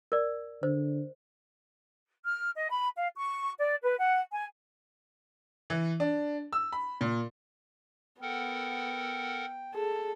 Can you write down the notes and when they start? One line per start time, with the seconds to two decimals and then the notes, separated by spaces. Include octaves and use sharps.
0.12 A#4 D5
0.63 D3 C5
2.24 F6
2.56 D#5
2.69 B5
2.97 F5
3.16 C#6
3.58 D5
3.83 B4
3.99 F#5
4.31 G#5
5.70 E3
6.00 D4
6.53 E6
6.72 B5
7.01 A#2
8.22 B3 A4 A#4 F#5 G5
9.75 G#4 A4